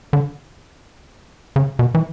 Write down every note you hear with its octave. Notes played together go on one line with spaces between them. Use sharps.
D3
C#3
B2
E3